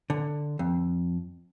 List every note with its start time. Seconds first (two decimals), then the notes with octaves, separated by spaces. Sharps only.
0.10 D3
0.59 F2